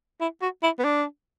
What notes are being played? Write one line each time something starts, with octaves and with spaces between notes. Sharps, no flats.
E4
F#4
E4
B3
D4